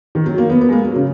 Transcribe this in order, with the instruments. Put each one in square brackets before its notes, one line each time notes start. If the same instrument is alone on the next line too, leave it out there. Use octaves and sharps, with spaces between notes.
[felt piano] D#3
F#3
A#3
B3
B3
G#3
A#3
F#3
C#3